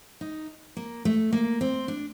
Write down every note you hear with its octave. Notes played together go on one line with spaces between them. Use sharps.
D#4
A#3
A3
A#3
C4
D4